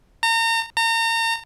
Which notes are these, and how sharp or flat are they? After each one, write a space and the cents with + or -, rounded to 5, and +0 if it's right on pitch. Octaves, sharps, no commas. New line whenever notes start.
A#5 -35
A#5 -35